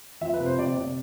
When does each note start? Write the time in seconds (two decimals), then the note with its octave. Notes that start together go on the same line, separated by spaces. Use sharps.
0.21 F3 E5
0.34 B4
0.40 C3
0.46 C5
0.58 C3 D5
0.77 C3 D5